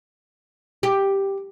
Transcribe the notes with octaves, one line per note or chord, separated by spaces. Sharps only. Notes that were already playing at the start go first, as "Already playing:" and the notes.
G4